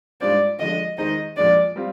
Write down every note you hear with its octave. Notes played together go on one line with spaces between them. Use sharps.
G#2 G3 D4 F4 C5 D5
D3 F3 G#3 D4 D#5
D#3 G#3 D#4 G#4 C5 D#5
A#2 F3 G#3 D4 D5
G3 C4 F4